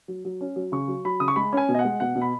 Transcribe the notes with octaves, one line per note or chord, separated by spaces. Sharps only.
F#3
F#3
C#4
F#3
C#3 C#6
F#3
F#3 B5
C#3 D#6
C#6
G#3 B5
C#4 G#5
B2
D#5
F#5
G#3
B2 F#5
B2
B5